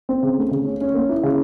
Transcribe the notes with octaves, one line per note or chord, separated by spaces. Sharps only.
C4
C#3
A3
C#3
C#4
C#4
A#3
E4
C#3